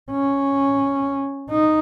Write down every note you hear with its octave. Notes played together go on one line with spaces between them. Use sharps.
C#4
D#4